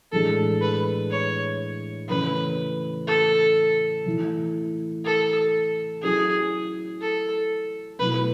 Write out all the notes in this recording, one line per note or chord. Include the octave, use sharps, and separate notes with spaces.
A2 E3 G#3 D4 A4
B4
C#5
C#3 E3 A3 C#4 B4
A4
E3 A3 E4
A4
F#3 C#4 E4 G#4
A4
B2 F#3 A3 E4 B4